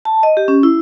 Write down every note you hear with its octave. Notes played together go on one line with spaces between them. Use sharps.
A5
D#5
G4
C#4
E4